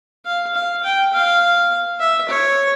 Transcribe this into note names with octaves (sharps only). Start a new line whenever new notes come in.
F5
F5
G5
F5
E5
C#5